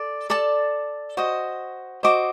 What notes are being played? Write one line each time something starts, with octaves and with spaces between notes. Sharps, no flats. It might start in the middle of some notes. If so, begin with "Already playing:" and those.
Already playing: A4 D5
A4 D5 A5
F#4 C5 D#5
F#4 C5 D#5 D6